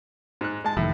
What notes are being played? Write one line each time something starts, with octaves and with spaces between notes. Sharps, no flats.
G#2 F#6
G#3 A5
F1 A2 D#3 A3